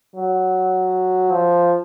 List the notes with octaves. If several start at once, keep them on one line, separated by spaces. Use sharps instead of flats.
F#3
F3